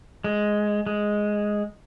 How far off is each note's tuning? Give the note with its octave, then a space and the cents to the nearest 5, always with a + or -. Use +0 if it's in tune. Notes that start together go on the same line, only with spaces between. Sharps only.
G#3 +5
G#3 +0